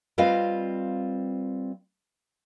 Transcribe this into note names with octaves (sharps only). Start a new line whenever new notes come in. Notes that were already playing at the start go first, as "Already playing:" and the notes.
G3 C4 F4 B4 D#5 F5